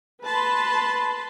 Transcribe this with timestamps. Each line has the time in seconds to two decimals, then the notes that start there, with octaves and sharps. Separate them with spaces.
0.24 B4 A5 B5 C6